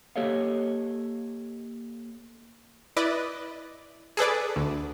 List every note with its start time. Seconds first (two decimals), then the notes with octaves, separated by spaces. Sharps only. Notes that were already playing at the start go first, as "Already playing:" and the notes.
0.16 A#3 G4 A4 C#5 D#5 F5
2.97 E4 B4 D5 D#5
4.17 G#4 A4 B4 D5
4.56 D2